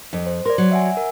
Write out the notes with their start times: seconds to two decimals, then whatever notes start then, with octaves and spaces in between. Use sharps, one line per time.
0.13 F2
0.27 C5
0.46 A#4 D5 C6
0.58 F#3
0.71 E5 F#5 G#5
0.97 A#4